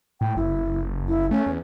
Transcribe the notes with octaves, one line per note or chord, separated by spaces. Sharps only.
A2 G5
F#1 E4
E4
A3 C#4
E2